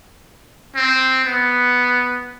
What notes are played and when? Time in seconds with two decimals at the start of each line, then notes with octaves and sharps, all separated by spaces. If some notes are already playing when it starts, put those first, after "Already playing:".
0.75 C4
1.25 B3